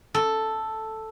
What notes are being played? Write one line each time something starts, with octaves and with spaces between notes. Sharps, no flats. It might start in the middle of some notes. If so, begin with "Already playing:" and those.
A4